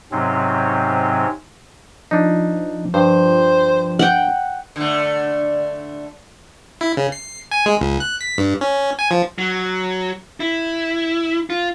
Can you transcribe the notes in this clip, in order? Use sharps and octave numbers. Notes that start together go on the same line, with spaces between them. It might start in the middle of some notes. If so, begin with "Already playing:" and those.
G#2 C3 F#3 C4 C#4
F3 D4 D#4
G2 C5
F#5 G5
D3 A3
E4
C#3
C7
G#5
G#3
C#2
F#6
B6
G2
C#4
G#5
F3
F#3
E4
F4